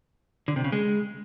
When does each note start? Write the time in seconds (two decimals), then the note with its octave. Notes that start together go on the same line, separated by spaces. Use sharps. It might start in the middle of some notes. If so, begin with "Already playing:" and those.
0.48 D3
0.56 C3
0.64 C#3
0.72 G#3